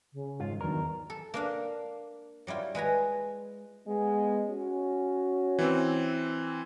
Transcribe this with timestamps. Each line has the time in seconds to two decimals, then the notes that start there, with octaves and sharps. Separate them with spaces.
0.13 C#3
0.40 G#2 D#3 F4
0.61 E2 D#3 F#3 D4 A#4
1.10 A4
1.34 A#3 D4 F5
2.47 F#3 G3 E4 F4
2.75 G#3 B4 G#5 A#5
3.87 G#3 B3
4.48 C#4 F#4
5.59 E3 C4